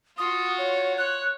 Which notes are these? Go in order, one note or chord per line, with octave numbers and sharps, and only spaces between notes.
F4 F#4 D#6
C#5
C#5 F#6